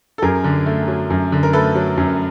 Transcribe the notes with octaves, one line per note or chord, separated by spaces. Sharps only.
A4
F#2 G#4 A#4
D3
A3
F#3
F#2
D3
A#4
A3 A4 B4
F#3
F#2